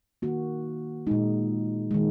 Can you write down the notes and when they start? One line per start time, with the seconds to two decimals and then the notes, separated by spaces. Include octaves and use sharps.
0.22 D#3 A#3 F#4
1.07 A#2 G#3 D#4
1.91 D#3 G#3